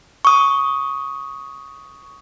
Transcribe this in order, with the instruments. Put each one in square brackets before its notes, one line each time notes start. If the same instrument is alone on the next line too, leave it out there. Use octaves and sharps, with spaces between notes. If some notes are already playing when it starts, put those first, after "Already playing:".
[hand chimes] C#6 D#6